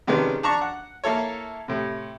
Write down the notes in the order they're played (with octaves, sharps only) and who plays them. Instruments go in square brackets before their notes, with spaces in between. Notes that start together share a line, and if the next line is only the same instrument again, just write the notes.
[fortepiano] C3 D#3 G#3 B3 C#4 D4
D4 A5 A#5 C#6
F#5
A#3 E4 A4 C#5
A2 C3